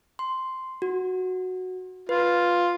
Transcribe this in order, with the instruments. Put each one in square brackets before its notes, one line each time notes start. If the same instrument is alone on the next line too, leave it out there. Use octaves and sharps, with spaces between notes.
[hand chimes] C6
F#4
[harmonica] F4 [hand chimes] B4